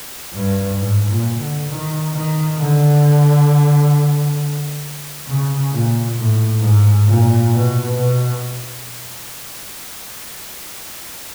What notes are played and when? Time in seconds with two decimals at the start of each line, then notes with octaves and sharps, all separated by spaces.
0.33 G2
0.78 G#2
1.09 A#2
1.38 D3
1.68 D#3
2.13 D#3
2.58 D3
5.27 C#3
5.71 A#2
6.16 A2
6.61 G#2
7.06 A#2
7.51 B2
7.96 B2